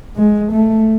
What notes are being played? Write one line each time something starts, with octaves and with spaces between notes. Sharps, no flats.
G#3
A3